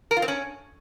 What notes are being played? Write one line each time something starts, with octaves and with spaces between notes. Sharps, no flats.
A#4
F4
C4
C#4